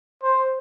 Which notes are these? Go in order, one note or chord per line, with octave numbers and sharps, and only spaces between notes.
C5